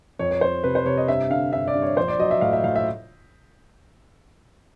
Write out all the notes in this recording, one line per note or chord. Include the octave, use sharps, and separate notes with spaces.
F2 C#5
C#5
F2 C5
C3 B4
C5
C3 C#5
D#5
G2 E5
D3 F5
G2 E5
D5
G2
C#5
A#1 C5
D5
F#3 D#5
E5
A2 F5
E5
A2 F5
E5